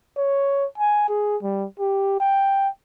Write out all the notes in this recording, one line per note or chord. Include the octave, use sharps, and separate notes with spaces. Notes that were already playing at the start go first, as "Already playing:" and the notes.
C#5
G#5
G#4
G3
G4
G5